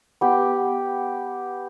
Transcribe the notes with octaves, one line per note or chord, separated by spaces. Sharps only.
B3 G4